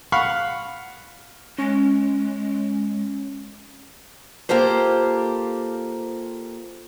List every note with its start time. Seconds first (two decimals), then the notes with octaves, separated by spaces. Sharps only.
0.12 F5 F#5 B5 C#6
1.58 G#3 C#4
4.49 A#3 F4 G4 A4 C5